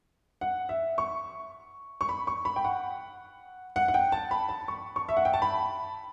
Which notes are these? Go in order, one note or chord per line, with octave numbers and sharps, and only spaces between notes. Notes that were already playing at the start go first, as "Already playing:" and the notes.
F#5
E5
C#6
C#6
B5
C#6
B5
G5
F#5
F#5
F#5
G5
A5
B5
A5
C#6
C#6
E5
F#5
G5
A5
B5